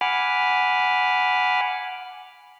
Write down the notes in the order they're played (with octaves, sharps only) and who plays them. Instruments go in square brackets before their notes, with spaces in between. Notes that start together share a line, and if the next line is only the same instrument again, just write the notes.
[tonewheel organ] F#5 G#5 B5 D6 F6